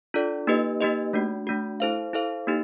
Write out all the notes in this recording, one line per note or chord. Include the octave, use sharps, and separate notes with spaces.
D4 F4 A4 D5
A#3 D#4 G4 B4 D#5
A#3 D#4 G4 B4 D#5
A3 D4 F#4
A3 D4 F#4
E4 A4 C5 F5
E4 A4 C5 F5
A#3 D#4 G4